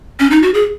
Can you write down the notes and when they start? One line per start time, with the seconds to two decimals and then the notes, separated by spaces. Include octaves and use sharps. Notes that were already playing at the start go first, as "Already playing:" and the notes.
0.20 C#4
0.31 D#4
0.42 F#4
0.54 G#4